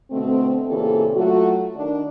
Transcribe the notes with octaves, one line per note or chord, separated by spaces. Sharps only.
B2 D3 A3 C4
A#2 C#3 E3 C4 G4 A4
F#3 A3 F4 F#4
D#3 D4